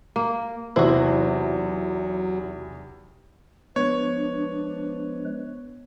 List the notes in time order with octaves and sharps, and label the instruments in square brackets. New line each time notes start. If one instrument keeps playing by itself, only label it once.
[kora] A#3
[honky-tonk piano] B1 E2 C3 [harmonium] F#3 [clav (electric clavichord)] E4 F#4 [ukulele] C5
[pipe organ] F3 G#3 B4 [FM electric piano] B3 [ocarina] D4 [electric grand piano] C#5